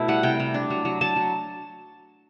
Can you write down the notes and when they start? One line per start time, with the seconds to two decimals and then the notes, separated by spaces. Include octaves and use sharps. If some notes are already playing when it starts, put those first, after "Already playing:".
Already playing: B2 A3 E4
0.08 G3 F#5
0.23 C3 G5
0.40 C3
0.54 D4
0.70 F#3
0.85 F#3
1.01 F#3 A5
1.16 F#3